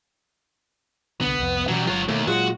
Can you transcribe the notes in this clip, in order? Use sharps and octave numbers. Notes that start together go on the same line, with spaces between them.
C2 D3 B3
C2 F2
B2 E3 F#3 G3 C#4
G1 F#3 F4 C#5
D#2 B2 A3
A#2 F#3 G#3 F4 F#4